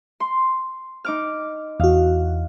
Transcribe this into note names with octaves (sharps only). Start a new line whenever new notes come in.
C6
D#4 D6 F6
E2 F#4 F5